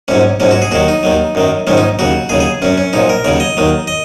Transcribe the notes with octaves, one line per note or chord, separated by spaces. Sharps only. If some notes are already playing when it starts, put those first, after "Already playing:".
A#1 G#2 F#3 C#4
A#1 G#2 F#3 C#4
F#4
G#4
D#2 D#3 F#3 F#4
D#4
D#2 D#3 F#3
F#2 D#3 F#3
A#1 G#2 D#3 F#3 C#4
D#4
D#2 C#3 F#3 F#4
D#2 C#3 F#3 G#4
G#4
F#2 F#3 C#4
C#4
A#1 A#2 F#3 D#4
A#4
D#2 C#3 F#3 C#5
D#5
D#2 D#3 F#3
D#5